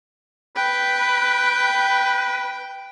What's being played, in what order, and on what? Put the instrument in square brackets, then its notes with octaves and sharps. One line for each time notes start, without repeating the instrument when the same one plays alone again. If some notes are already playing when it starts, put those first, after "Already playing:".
[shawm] B4 [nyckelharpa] G5